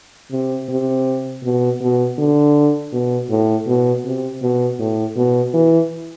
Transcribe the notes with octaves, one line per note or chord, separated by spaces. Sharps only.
C3
C3
B2
B2
D3
B2
A2
B2
C3
B2
A2
B2
E3